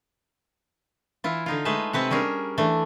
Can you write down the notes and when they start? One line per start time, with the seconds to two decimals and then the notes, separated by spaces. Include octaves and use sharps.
1.24 E3 E4 F4
1.46 D3 D#4 F4
1.65 G#3 A3 G#4 B4 A5
1.93 C3 C4 B4 F#5
2.10 G3 C#4 D4 G#4 A#4
2.58 E3 A3 D4